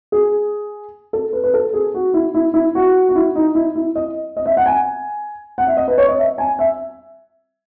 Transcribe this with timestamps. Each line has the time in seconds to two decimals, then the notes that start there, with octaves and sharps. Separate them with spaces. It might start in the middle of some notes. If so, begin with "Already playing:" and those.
0.12 G#4
1.13 A4
1.33 B4
1.44 B4
1.54 A4
1.74 G#4
1.94 F#4
2.14 E4
2.34 E4
2.54 E4
2.75 F#4
3.09 F#4
3.16 E4
3.35 D#4
3.55 E4
3.76 E4
3.96 D#5
4.37 D#5
4.46 E5
4.57 F#5
4.66 G#5
5.58 F#5
5.67 E5
5.77 D#5
5.88 B4
5.98 C#5
6.08 D#5
6.18 E5
6.38 G#5
6.59 E5